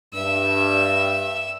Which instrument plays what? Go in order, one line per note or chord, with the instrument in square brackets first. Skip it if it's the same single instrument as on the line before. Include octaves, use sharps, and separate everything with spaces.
[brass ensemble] G2 [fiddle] E5 E6